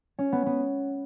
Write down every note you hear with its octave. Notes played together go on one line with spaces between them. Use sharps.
C#4
B3
B3